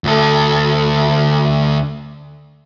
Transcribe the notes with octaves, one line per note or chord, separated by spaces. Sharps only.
D2 A4